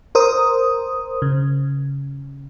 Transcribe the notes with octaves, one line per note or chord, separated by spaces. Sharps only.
A#4 C5 D#6
C#3